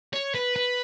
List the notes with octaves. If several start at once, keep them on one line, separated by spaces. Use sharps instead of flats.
C#5
B4
B4